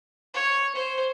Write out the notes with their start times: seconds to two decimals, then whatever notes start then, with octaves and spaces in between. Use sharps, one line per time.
0.34 C#5
0.75 C5